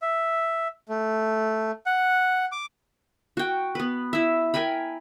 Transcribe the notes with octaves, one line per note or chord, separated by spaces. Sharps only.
E5
A3
F#5
D6
F#4 G5
B3 B4
E4 E5
A#4 G5 G#5 B5